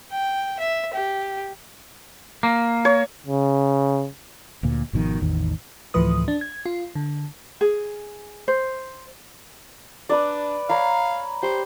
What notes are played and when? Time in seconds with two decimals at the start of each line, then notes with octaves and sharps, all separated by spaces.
0.11 G5
0.60 E5
0.93 G4
2.43 A#3
2.85 C#5
3.26 C#3
4.63 D2 A#2
4.93 G#1 B2 D#3 F3
5.21 A1 E2 D#3
5.94 D2 A2 E3 F3 B4 D#6
6.28 D4
6.41 G#6
6.66 F4
6.95 D3
7.61 G#4
8.48 C5
10.09 D4 B4 D5
10.69 C#5 F5 A#5 B5
11.43 G4 C5